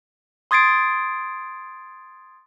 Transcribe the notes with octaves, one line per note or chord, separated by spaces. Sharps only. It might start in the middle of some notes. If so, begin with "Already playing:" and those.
C6 D#6 G#6 A6 C7 D7